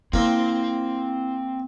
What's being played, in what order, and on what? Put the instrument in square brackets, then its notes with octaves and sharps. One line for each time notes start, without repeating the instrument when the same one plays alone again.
[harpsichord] A#3 [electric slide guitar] C4 C5 [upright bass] E4